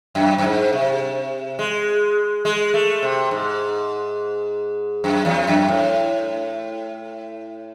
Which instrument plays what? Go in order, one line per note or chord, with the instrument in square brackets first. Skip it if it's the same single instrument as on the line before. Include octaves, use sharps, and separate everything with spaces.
[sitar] F#2
F#2
G#2
C3
G#3
G#3
A3
C3
G#2
F#2
E2
F#2
A2